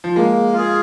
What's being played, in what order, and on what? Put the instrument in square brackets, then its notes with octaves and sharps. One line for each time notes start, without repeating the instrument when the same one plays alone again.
[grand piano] F3
[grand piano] G#3 [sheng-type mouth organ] A#3
[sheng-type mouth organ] F4 G#4